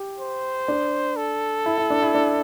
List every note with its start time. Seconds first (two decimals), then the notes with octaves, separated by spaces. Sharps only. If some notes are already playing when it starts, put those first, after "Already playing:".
Already playing: G4
0.19 C5
0.68 D4
1.17 A4
1.66 E4
1.78 E4
1.90 D4
2.02 E4
2.15 D4